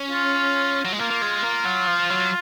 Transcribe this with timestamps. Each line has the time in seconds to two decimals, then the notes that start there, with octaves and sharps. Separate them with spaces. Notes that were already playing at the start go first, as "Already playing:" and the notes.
Already playing: C#4
0.11 F4
0.85 F#3
0.92 G#3
0.99 A#3 F4
1.11 A#3
1.22 G#3
1.43 A#3
1.65 F#3
1.87 F3
2.10 F#3